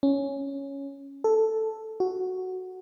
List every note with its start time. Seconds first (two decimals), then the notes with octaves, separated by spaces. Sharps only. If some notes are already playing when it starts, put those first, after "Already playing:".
0.03 C#4
1.24 A4
2.00 F#4